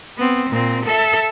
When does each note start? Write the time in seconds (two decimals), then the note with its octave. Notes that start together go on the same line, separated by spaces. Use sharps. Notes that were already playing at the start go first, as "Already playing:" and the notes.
0.18 B3 C4
0.50 A#2 C4
0.85 A4 E5